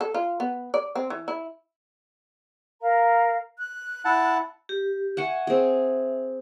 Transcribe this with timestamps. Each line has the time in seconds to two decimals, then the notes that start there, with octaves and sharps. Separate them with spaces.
0.01 A4
0.14 F4
0.40 B3
0.74 D5
0.95 C4
1.10 E3
1.28 E4
2.82 A#4 F5 A#5
3.59 F#6
4.05 E4 F#5 A5
4.69 G4
5.17 E5 F#5 G#5 C#6
5.47 C4 G#4